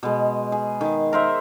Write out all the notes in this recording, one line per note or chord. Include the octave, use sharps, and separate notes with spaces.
B2 G#3
G#4
D#3
A#4 C5 E5